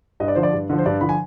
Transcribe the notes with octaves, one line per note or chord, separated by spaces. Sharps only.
G2 D#5
D5
D3 F3 C5
D5
G2
D3 F3
C5
G2 D5
D3 F3 B5
G#5